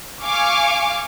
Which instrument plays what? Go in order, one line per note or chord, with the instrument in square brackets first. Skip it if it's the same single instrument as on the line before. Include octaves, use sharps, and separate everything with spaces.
[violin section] F5 G#5 C#6 D6 F6